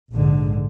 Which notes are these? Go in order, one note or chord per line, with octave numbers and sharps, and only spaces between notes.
A#1 G#2 D3